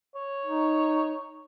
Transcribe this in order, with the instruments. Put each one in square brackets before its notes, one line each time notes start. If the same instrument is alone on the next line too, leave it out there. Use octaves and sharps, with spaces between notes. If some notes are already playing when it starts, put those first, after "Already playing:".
[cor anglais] C#5
[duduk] D#4